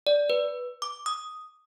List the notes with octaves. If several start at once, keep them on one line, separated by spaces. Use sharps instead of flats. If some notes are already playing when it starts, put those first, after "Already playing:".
D5
B4
D6
D#6